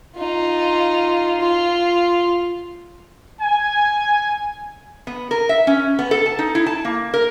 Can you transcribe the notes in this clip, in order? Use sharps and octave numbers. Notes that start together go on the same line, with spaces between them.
D#4 F4
F4
G#5
B3
A#4
E5
C#4
B3
A4
A5
D#4
E4
A5
A#3
A#4